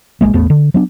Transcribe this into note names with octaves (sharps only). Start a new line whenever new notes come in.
A#1 G2 G#3 A#3
A1 E2 A3 B3
D3
F#3 B3 D4